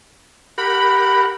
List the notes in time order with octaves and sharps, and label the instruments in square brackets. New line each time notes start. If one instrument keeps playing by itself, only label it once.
[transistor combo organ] G4 A#4 F#5 [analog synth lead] B5